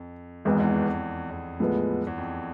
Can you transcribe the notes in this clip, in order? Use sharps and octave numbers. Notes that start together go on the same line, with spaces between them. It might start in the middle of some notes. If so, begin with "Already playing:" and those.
Already playing: F2
G#1 E2 G#2 E3 B3
E2
F2
E2
A2 F3 G#3 B3
E2
F2